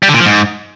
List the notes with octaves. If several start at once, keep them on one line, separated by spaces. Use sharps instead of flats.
G3
D3
A#2
F3
G#2